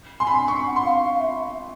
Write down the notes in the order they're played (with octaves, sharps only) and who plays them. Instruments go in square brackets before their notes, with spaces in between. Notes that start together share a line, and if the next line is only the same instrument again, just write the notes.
[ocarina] G#5 [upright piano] C6
[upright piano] B5
C6
C#6
[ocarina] F#5
[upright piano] C6
[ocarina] F5
F5
E5